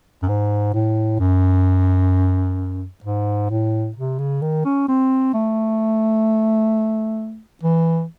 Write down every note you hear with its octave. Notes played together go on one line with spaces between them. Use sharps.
F#2
G#2
A2
F#2
G#2
A2
C3
C#3
D#3
C#4
C4
A3
E3